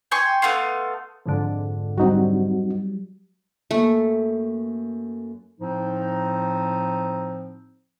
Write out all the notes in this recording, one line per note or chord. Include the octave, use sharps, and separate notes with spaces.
G5 G#5 C6 C#6
A3 B3 F5 C6
F2 G#2 D3
F#3 G3 C4 D#4 F#4
F#2 A3 A#3
A2 F3 C4 D#4